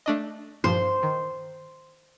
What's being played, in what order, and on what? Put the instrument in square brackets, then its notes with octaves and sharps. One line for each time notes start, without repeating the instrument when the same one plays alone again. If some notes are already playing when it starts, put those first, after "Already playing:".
[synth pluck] A3 D4 D#5
[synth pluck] G2 A#2 F3 [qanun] C5
[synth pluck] D#3